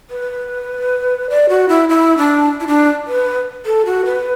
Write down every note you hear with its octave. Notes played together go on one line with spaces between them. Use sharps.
B4
D5
F#4
E4
E4
D4
E4
D4
B4
A4
F#4
B4